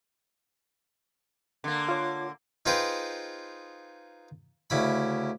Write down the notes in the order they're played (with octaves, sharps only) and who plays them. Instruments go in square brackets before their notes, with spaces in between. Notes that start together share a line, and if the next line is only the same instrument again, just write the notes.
[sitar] D3 A#3
[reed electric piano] F4 C#5
[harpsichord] D#4 F4 G#4 B4 C5 G5
D2 C#3 E4 B5